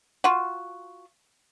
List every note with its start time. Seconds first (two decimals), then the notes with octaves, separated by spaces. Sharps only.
0.24 F4 F#4